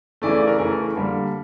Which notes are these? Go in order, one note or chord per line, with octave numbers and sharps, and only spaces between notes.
C#3 E3 A3 D5
D5
A#4
C#3 E3 A3 A#4
A4
D3 G3 A#3